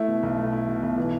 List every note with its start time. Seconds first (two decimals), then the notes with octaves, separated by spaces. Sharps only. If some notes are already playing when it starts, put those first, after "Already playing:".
Already playing: A3 E4
0.08 B2
0.23 B1
0.38 A3
0.53 E4
0.68 B2
0.83 B1
0.98 E3